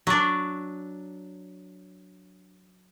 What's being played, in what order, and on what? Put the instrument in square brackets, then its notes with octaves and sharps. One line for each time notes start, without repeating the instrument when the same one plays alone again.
[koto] F#3 D4